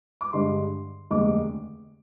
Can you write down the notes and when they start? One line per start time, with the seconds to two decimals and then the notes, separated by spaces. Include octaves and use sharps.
0.21 D6
0.33 G2 D3 G#3 C6
1.11 F1 D#2 D3 G#3 D6